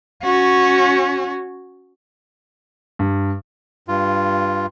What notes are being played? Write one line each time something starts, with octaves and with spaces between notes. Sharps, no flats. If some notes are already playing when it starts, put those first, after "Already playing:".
C#4 F#4
G2
G2 F4